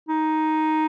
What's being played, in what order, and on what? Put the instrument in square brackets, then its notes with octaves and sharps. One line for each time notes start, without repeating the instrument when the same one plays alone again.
[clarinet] D#4